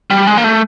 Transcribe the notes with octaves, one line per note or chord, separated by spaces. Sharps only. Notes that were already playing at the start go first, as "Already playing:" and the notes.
G3
G#3
A#3
A3